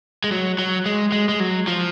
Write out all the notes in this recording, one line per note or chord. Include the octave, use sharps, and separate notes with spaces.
G#3
F#3
F#3
G#3
G#3
G#3
F#3
F3